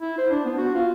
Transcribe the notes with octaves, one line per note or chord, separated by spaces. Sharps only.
E4
C5
D4
B3
F#4
F4